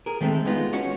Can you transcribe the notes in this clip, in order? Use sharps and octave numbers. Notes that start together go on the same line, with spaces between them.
G#4 A#4
D#3 G#3 A3 C4
G#3 B3 D#4 F4
C#4 F#4 C#5